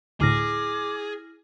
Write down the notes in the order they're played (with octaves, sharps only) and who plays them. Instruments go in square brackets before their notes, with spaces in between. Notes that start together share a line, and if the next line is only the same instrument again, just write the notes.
[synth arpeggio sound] D2 A2 [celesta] E4 F6 A#6 [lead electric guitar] G#4 [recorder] D6